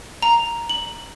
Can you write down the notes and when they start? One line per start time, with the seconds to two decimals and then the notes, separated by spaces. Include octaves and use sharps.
0.22 A#5
0.69 F#7